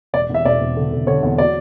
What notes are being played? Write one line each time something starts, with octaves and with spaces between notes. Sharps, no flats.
E1 D5
E2 E5
E1 D5
E1
D3
D3
D3 C#5
E2
F#3 D5